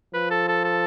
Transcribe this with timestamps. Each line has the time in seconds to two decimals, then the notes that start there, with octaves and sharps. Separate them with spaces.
0.13 F3 B4
0.31 A4
0.48 A4
0.65 A4